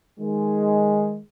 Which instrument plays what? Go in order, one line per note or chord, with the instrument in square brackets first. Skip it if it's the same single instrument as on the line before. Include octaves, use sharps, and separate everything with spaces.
[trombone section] D#3 G#3